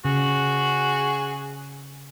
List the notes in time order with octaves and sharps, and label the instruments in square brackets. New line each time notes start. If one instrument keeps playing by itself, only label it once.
[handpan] C#3 [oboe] F#4 [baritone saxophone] G#4